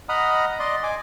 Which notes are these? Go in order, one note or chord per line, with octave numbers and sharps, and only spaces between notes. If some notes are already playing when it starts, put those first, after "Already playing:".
D#5 F#5 A#5 B5 D#6 F6
D5 D#5 C6
G#5 D6